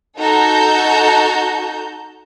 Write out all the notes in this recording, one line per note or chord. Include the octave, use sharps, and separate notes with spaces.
D#4 F#4 A4 A5 A#5 G6